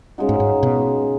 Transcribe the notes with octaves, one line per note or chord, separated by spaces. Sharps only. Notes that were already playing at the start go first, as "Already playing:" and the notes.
C#3 G#3 D#4 F#4
G#2
G#2
B2